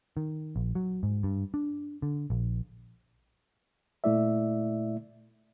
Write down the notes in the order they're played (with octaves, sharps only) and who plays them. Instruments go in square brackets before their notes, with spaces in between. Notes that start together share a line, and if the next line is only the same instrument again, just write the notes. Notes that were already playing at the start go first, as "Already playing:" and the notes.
[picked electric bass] D#3
A#1
F#3
G#2
G2
D4
D3
A#1
[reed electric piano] A#2 A3 E4 D5 E5